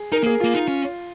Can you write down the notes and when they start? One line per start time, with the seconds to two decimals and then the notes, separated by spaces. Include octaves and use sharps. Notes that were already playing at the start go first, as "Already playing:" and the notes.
Already playing: G#4
0.12 D#4 A#4
0.22 A#3 G#4
0.40 A#3 F4
0.55 D#4
0.68 C#4